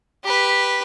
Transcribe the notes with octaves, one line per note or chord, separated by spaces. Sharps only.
G4 B4